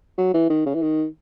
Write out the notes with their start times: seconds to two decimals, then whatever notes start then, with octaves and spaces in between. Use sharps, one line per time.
0.18 F#3
0.34 E3
0.50 D#3
0.66 C#3
0.75 E3
0.82 D#3